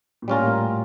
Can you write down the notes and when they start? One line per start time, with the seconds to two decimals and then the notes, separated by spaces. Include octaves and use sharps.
0.22 A#2
0.28 A2 G3 C#4 F4 A#4